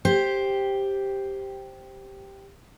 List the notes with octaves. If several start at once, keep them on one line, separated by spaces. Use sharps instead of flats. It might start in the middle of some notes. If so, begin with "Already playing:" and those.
G4 C5